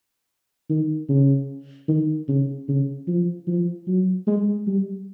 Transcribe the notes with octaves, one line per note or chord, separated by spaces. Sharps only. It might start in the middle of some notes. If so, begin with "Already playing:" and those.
D#3
C#3
D#3
C#3
C#3
F3
F3
F#3
G#3
G3